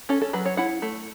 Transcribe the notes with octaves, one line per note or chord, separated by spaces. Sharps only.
C#4 A4
A4
F#3 B4
C#5
E4 F#5
A3